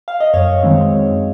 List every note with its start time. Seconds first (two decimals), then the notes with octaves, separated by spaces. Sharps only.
0.08 F5
0.20 D#5
0.34 F#2 C#5
0.63 D#3 G#3 C4
0.92 F#2